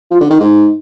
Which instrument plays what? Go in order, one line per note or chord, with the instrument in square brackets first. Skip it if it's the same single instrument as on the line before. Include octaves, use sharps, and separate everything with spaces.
[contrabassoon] F3
D3
D#3
G#2